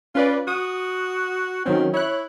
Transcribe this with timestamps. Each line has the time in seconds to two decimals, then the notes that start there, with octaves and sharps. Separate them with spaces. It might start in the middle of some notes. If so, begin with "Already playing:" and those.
0.15 C#4 F4 B4 D5
0.48 F#4 D#6
1.66 D#3 F#3 C4 C#4
1.94 E4 C#5 F#6